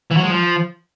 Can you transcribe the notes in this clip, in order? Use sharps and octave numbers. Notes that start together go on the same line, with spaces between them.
E3
F#3
G#3
F3